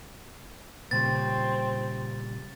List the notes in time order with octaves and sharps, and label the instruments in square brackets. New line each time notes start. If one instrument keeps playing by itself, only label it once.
[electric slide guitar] A#2 C#3 G3 [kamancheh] C4 [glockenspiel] A6